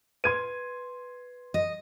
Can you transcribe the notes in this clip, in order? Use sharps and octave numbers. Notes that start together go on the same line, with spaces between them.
B4 C6 G#6 D#7
D#5